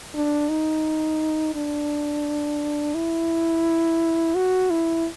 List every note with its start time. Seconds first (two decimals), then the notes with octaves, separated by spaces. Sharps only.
0.15 D4
0.49 D#4
1.55 D4
2.95 E4
4.35 F#4
4.70 E4